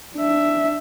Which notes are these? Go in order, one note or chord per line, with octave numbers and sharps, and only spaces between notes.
D4 E5